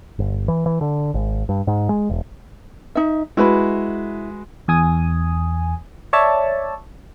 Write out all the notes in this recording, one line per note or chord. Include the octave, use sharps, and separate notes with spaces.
G1
E3
E3
D3
G#1
G2
G#2
G#3
E1
D#4 E5
G#3 E4 F#4 B4 B5
E2 G#5 D#6
C#5 D5 E5 A5